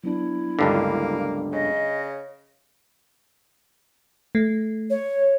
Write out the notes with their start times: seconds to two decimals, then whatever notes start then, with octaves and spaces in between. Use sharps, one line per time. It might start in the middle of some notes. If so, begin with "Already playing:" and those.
0.04 F#3 B3 D4 E4
0.59 C#2 G2 D3 A#3
1.53 C#3 D#5
4.35 A3
4.90 C#5